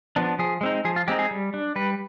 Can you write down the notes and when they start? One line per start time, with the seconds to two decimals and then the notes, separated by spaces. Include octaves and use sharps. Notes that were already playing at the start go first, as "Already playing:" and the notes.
0.16 F3 B3 D4
0.39 F3 G#4
0.61 G#3 C4 D#4
0.85 F3 G#4
0.96 F4
1.08 G#3 C4 D#4 G4
1.19 G#4
1.31 G3
1.54 D4
1.76 G3 B4